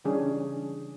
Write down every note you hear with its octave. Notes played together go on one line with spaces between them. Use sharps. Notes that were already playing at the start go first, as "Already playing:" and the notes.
C#3 E3 G3 C#4 D4 G#4